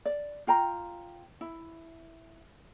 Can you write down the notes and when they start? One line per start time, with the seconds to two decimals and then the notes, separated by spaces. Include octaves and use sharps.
0.05 D5
0.47 F4 G5 A#5
1.41 E4